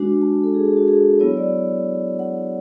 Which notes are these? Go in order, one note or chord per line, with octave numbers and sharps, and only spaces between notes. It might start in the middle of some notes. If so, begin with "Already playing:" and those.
Already playing: G#3 D4 F#4
A5
A4
G#4
G#4
F#4
G#4
F#3 B3 E4 C#5
D5
F#5